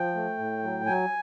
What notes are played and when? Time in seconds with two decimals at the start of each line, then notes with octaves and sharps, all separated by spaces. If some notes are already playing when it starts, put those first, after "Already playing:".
Already playing: F3 G5
0.15 A3
0.38 A2
0.63 F#3
0.86 F#3 G#5